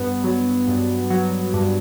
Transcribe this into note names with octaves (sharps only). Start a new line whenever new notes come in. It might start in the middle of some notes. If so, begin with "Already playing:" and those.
Already playing: G2 B3
F#3
G2
F#3
G2